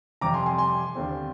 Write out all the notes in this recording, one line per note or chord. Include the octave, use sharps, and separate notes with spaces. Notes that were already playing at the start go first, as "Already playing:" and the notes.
F2 C3 G3 A#5 D6
G#5 C6
G#5 C6
G#5 C6
D#2 D3 G3 C4